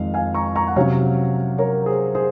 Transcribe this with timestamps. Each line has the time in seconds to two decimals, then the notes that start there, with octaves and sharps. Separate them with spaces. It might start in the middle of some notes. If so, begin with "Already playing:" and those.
Already playing: F2 D#3 G#3 C4 F5
0.14 F5 G#5
0.34 A#5 C#6
0.56 A#5 C#6
0.68 F#5
0.76 C3 F#3 C#4 C#5 F5
1.58 A#4 C#5
1.86 G#4 C5
2.15 G#4 C5